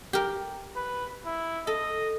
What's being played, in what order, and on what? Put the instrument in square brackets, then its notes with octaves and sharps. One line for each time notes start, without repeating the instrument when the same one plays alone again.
[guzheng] G4 A#4
[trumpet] B4
E4
[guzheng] A4 [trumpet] D#5